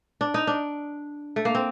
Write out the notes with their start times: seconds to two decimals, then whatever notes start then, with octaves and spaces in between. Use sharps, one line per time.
0.21 D4
0.34 D#4
0.47 D4
1.36 A3
1.45 A#3
1.55 C4